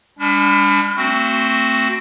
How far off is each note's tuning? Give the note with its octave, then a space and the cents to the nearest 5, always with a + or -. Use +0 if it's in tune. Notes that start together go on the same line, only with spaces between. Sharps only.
G3 +40 D4 -35
A3 +35 C4 +0 F#4 +5